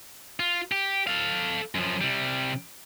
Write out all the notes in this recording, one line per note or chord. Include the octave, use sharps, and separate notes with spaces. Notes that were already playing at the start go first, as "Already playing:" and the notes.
F4
G4
A4 F5
F#2 F3
C3 G3